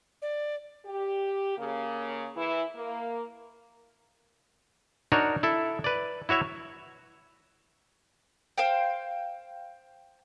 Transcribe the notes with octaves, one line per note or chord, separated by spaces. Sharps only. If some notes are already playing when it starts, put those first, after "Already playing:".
D5
G4
C#3 A#3
E3 E4
A#3
D4 D#4 F#4 A#4 C#5
E4 A4 E5
B4 D5
E4 F#4 C#5 E5
C5 F5 G5